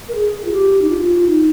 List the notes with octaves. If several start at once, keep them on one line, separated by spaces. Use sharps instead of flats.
A#4
G#4
F4
G4
D#4
F4
D#4